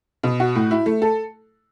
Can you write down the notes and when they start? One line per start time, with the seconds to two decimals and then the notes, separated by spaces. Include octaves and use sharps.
0.23 B2
0.40 F#4
0.56 A2
0.71 E4
0.86 A3
1.02 A4